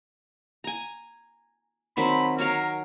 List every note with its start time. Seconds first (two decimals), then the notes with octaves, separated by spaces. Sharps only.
0.64 G#5 A#5
1.97 D#3 F#3 C4 B5
2.39 F#3 A#4 C#5 F5